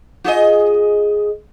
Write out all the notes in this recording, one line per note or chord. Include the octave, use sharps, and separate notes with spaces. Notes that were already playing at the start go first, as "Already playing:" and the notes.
F4 G#4 D#5